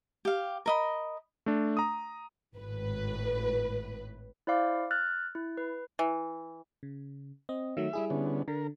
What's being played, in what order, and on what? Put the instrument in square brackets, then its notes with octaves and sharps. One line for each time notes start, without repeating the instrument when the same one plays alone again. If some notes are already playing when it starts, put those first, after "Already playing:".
[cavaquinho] G4 F5
A#4 D#5 B5
[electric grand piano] A3 D4
A#5 D#6
[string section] G#1 A2 B4
[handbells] E4 C5 D5 F5 D6
F6 F#6 A6
E4
B4
[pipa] E3
[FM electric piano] C#3
C4 D#5
[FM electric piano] D#3 F#3 A3 [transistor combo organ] E5
[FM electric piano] G3 E4 G#4
[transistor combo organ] D3 B3 C#4
[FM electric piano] D3 [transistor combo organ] A#4